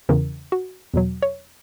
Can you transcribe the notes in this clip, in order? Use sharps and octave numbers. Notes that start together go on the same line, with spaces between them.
E2 C#3 E3 A#4
F#4
E2 B2 F#3
C#5